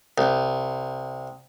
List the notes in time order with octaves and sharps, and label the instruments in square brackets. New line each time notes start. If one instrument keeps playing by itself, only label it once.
[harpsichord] C2